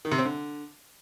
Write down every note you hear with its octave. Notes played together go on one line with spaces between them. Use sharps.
D#3
C3
C4
D3